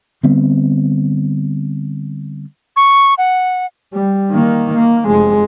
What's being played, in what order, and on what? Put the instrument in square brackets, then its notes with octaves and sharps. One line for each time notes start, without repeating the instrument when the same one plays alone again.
[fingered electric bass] D3 G3 B3 C4
[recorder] C#6
F#5
[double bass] G3
D#3 A#3
A#3
F1 G#3